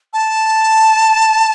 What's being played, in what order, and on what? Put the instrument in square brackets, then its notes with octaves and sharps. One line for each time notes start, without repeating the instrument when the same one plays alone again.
[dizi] A5